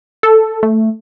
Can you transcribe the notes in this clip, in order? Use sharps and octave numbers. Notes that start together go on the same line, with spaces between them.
A4
A3